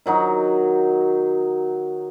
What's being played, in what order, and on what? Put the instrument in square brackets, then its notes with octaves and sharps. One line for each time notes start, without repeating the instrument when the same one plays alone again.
[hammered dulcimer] D#3 F#3 D#4 F#4